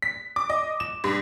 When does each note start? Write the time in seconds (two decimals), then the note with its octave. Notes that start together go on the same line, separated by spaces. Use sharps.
0.02 B6
0.36 D6
0.50 D#5
0.80 E7
1.04 G2